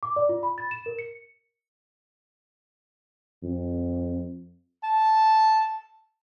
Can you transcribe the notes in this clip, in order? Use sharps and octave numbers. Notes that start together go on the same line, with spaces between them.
D6
D5
F4
B5
A6
E7
A#4
C#7
F2
A5